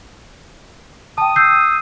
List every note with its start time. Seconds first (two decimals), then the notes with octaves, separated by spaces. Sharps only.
1.18 G5 A5 D#6
1.36 E6 G6 C7